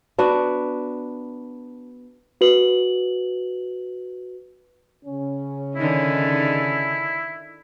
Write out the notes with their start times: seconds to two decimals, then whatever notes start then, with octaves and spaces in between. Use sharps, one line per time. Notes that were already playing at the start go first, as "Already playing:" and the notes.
0.18 B3 D4 F#4
2.41 F#4 B4 F#7
5.05 C#3 C#4
5.76 D3 D#3 D#4 E4